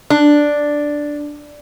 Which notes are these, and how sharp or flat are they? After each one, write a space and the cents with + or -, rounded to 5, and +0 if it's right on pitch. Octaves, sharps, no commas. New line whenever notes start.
D4 +0